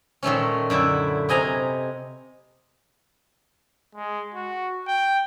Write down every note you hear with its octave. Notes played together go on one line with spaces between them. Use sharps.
A#2 D#3 A3 C#4
F#2 D3 E4
C3 D#5 G#5 A#5 B5
G#3
F#4
G5